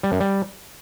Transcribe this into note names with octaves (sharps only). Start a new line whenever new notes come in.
G3
F#2
G3